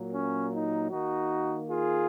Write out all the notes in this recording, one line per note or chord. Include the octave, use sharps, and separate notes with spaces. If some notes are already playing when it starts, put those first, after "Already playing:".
Already playing: A#2 F#3 A#3
C#4
D#4
D#3 A#3 D#4 F#4
F4 G#4